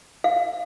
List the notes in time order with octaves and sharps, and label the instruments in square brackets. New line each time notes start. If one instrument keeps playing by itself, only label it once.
[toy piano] F5